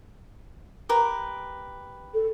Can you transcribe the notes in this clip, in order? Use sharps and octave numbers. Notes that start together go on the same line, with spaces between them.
G4 A#4 B4
A4